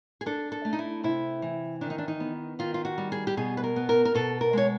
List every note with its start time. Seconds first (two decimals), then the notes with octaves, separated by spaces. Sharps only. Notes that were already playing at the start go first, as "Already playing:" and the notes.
0.21 G#4
0.26 D4 A4
0.52 A4
0.65 A3
0.73 D#4
0.79 E4
1.03 C3 E4
1.42 E3
1.81 D#3 D4
1.90 D#4
1.98 D4
2.08 D#4
2.20 B3
2.59 D#3 F4
2.74 F4
2.85 F#4
2.98 G3
3.12 G#4
3.27 G4
3.37 B2 G#4
3.57 B4
3.64 A#4
3.76 B3
3.89 A#4
4.05 A#4
4.15 B2 A4
4.41 A#4
4.53 G#3 C#5